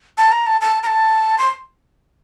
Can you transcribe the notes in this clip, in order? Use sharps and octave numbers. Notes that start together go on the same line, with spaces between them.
A5
A#5
A5
A5
A#5
A5
C6